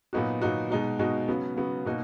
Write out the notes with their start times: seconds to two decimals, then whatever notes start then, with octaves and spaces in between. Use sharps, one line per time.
0.13 A#2 F#3 B3 D#4 F#4
0.42 A#2 F#3 B3 D#4 F#4
0.70 B2 G#3 D#4 F#4
0.99 B2 G#3 D#4 F#4
1.28 C#3 F#3 B3
1.57 C#3 F#3 B3
1.86 B2 A#3 D#4 F#4